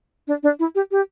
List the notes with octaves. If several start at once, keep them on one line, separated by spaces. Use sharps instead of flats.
D4
D4
E4
G4
G4